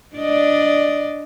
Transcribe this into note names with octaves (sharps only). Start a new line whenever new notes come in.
D4 D5 D#5